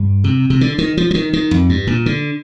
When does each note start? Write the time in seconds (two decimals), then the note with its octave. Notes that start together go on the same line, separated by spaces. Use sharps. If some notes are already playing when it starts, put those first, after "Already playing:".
Already playing: G2
0.24 C3
0.50 C3
0.61 D3
0.78 D#3
0.97 F3
1.11 F3
1.15 D#3
1.33 D#3
1.51 F2
1.69 G2
1.87 A#2
2.06 D3